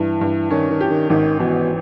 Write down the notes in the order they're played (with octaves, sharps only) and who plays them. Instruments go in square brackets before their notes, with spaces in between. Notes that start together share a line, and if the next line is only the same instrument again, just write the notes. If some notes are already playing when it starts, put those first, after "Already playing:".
Already playing: [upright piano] G2 [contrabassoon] E3
[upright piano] G2
[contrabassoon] D#3 [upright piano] C#4
[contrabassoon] D#3
[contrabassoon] E3 [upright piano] G4
[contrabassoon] D#3
[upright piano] G#1 [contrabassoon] D#3
[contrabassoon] B2 [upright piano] E3